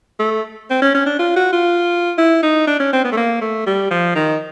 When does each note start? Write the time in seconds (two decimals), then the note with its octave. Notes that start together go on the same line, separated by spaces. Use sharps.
0.20 A3
0.70 C4
0.82 C#4
0.94 C#4
1.06 D4
1.19 F4
1.36 F#4
1.52 F4
2.18 E4
2.43 D#4
2.67 D4
2.80 C#4
2.93 C4
3.04 B3
3.12 A3
3.17 A#3
3.41 A3
3.66 G3
3.91 F3
4.15 D#3